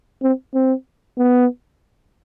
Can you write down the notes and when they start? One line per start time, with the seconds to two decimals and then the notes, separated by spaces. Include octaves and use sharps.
0.22 C4
0.54 C4
1.18 B3